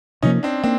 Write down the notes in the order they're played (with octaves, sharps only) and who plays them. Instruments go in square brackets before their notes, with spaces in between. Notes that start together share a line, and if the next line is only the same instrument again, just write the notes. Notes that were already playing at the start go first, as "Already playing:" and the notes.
[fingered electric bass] C3 F3 A#3 [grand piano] C#4 D#4
[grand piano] C4 D4
[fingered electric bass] A#3 [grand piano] C4 D4